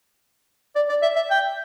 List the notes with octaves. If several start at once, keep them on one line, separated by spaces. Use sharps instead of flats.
D5
D5
E5
E5
G5